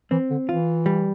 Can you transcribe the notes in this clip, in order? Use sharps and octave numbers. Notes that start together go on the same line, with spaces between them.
E3 C4
D3
E3 F4
G3